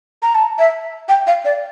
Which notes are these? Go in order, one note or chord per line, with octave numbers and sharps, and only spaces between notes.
A#5
A5
E5
G5
F5
D5